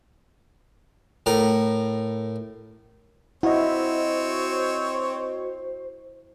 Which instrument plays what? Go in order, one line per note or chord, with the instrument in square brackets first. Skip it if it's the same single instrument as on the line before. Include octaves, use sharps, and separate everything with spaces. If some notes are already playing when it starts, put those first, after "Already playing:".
[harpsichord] A2 A#4
[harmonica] C4 C#5 [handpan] E4 [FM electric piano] F#4 D#5 [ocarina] C5